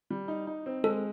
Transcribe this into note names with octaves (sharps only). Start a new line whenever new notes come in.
G3
D#4
D#4
C4
G#3 A4